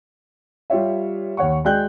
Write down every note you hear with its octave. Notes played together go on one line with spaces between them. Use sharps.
G3 F4 G4 C#5 E5
D#2 C#5 F#5 C#6
G#3 F#4 D5 G5 F#6 G6